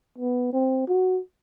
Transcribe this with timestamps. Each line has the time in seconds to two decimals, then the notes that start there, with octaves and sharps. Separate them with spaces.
0.18 B3
0.53 C4
0.88 F#4